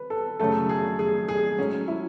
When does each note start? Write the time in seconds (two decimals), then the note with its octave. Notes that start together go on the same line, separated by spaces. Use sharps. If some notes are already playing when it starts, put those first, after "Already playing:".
Already playing: B4
0.10 A4
0.40 F#2 C#3 F#3 A3 A4
0.69 G#4
0.99 G#4
1.29 G#4
1.58 G#2 F#3 A3 C#4
1.88 E4